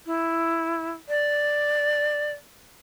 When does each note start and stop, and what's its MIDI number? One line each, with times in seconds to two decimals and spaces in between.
0.06 0.91 64
1.09 2.31 74